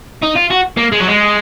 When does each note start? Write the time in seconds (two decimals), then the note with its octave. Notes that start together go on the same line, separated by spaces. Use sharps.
0.22 D#4
0.36 F4
0.50 F#4
0.77 A#3
0.92 G#3
1.00 F#3
1.07 G#3